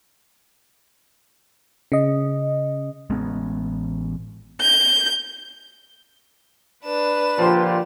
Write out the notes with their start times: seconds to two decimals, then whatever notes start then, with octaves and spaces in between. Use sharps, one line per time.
1.92 C#3 D#5
3.10 A1 G#3 B3 C#4
4.61 G6
6.85 D4 B4 E7
7.38 A#2 D3 F3 G4 C6